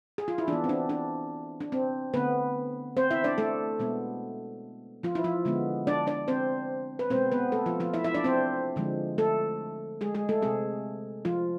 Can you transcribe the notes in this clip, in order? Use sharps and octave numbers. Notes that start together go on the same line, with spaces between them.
G#4
F4
E4
E3 B3 D4
C4
D4
D4
D4
C4
D3 A3 B3 C4 B4
C4 C5
E4 E5
D4 D5
A3 A4
B2 G#3 B3
F3 F4
E4
F3 F4
D3 G#3 B3
D4 D5
D4 D5
C4 C5
B4
B2 G#3 B3 C4 C5
B3 B4
A3 A4
F3 F4
F3 F4
E4 E5
E4 E5
D4 D5
C4 C5
D3 F3 G#3
A3 A4
G#3 G#4
G#3 G#4
A3 A4
C3 G#3 C4 G#4
F3 F4